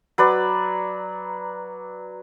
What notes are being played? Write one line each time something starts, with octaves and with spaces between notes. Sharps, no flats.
F#3 B4 D5